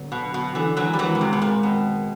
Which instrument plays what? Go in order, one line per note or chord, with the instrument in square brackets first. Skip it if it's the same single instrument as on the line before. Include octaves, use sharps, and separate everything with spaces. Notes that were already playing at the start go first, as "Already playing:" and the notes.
Already playing: [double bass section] D3 F#3 B3
[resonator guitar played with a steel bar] B2
B2
D3 E3
[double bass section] D#3 G#3 C4 [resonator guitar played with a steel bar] E3 F#3
[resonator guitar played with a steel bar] G3
E3 F#3
B2
C3
B2
A#2
B2